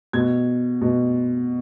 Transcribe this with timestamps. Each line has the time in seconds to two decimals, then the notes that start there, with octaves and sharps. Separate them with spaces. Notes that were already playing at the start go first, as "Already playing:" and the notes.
0.13 B2 G#6
0.81 B2